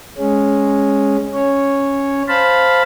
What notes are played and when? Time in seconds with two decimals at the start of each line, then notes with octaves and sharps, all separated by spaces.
0.18 G#3 C#4
1.34 C#4 C#5
2.28 C5 F5 A5 B5